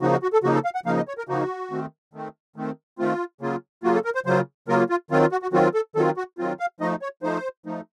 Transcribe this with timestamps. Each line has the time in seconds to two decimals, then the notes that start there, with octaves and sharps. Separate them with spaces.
0.01 C#3 F3 A#3 D#4 F#4
0.12 F#4
0.23 F#4
0.33 A4
0.43 C#3 F3 A#3 D#4 F#4
0.55 A4
0.65 F5
0.75 F#5
0.86 C#3 F3 A#3 D#4 F5
0.97 D#5
1.08 C#5
1.18 A#4
1.28 C#3 F3 A#3 D#4 F#4
1.71 D#3 A3 C4
2.14 D#3 A3 C4
2.56 D#3 A3 C4
2.99 D#3 A3 C4 F4
3.41 C#3 F#3 A#3 F4
3.83 C#3 F#3 A#3 F4 F#4
3.94 A4
4.05 A#4
4.15 C5
4.26 C#3 F#3 A#3 F4 C5
4.68 C#3 F#3 A#3 F4 A#4
4.89 F4
5.11 D#3 F#3 C4 F4
5.21 F4
5.32 F#4
5.42 F#4
5.53 D#3 F#3 C4 F4 F#4
5.74 A4
5.96 D#3 F#3 C4 F4 A4
6.17 F#4
6.38 D#3 F#3 C4 F4
6.60 F5
6.80 F3 A3 D#4 D#5
7.02 C#5
7.23 F3 A3 D#4 C5
7.66 F3 A3 D#4